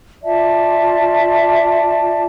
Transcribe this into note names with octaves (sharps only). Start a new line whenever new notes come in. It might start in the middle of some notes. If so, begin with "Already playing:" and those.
F4 D5 E5 A5